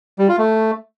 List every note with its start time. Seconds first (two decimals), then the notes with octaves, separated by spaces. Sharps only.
0.19 G3
0.28 F4
0.38 A3